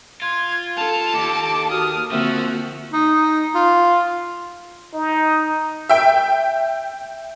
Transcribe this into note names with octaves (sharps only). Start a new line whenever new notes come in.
F4 G#6
A4 A5 F7
D#2 D6
F#4 D#6 F6
D3 F3 A#3 C4 F#4 E5
D#4
F4
D#4
E5 G5